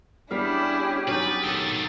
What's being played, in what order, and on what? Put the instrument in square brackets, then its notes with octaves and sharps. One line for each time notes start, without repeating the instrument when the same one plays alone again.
[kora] G3 B3 F5 [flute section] C#4 G4 G#4 [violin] D4 E4
[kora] F#3 D#4 [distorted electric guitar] B4 [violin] A6
[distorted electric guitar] D#3 A3 [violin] A6